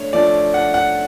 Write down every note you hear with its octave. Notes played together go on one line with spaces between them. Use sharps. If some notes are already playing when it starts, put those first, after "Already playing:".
Already playing: A3 D4 C#5
F3 A3 D4 D5
F#5
F#5